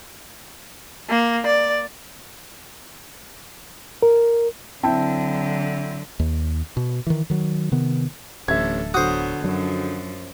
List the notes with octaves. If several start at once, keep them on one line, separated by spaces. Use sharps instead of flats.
A#3
D5
A#4
D3 F#3 C4 E4 G5 A5
D#2
B2
D#3 E3
D#3 F#3
C3 D#3 B3
D1 A1 D4 A4 E5 G#6
D3 F#3 B3 F#4 C5 D#6
F#2 F3 F#3 D4